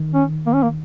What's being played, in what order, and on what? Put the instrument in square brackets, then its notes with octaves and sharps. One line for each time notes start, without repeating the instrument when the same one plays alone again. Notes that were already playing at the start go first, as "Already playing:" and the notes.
Already playing: [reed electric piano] D#3
[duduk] C#4
A#3
C#4
A#3